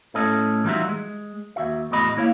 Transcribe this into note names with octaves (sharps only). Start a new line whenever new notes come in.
A2 A3 C#4 A4 D#5
E3 G3 D#4 F4 F#4 E5
G#3
D#2 F#4 E5
E2 A2 F#4 D#5 B5
A#3 E4 C#5 F5